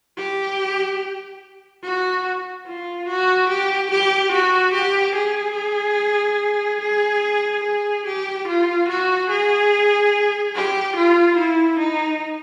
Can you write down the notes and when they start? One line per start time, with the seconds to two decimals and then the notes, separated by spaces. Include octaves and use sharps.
0.18 G4
1.83 F#4
2.66 F4
3.08 F#4
3.49 G4
3.91 G4
4.32 F#4
4.74 G4
5.15 G#4
6.81 G#4
7.64 G#4
8.06 G4
8.48 F4
8.88 F#4
9.30 G#4
10.55 G4
10.96 F4
11.38 E4
11.80 D#4